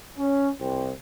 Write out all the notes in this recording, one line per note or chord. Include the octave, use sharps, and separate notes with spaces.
C#4
C2 C4